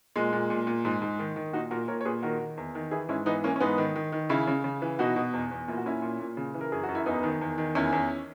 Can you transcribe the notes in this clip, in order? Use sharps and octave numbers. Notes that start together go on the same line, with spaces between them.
A#2 G#3
A#2
A#2
A#2
G#2
G#2
D#3
D#3
A#2 D#4 F#4
A#2 F#4 A#4
A#2 A#4 C#5
C#5
A#2 G#4 B4
D#3 F#4 A#4
D#3
E2
D#3
E3 E4 G#4
G#2 C#4 E4
E3 B3 D#4
E3 A#3 C#4
C#4
G#2 B3 D#4
D#3
D#3
D#3
C#3 C#4 E4
C#3
C#3
E3
B2 D#4 F#4
B2
E2
E2
A#2 E4
F#4
A#2 C#4 E4
A#2
A#2
C#3
E3
A#4
F#2 G#4
F#4
F#2
E4
E2 B3 D#4
D#3
E2
D#3
E2 C#4 E4
E2